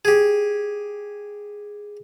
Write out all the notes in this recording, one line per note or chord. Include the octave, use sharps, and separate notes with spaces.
G4 G#4